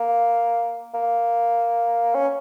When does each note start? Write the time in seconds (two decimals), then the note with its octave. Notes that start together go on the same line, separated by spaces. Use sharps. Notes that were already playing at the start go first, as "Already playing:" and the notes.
Already playing: A#3
0.94 A#3
2.15 C#4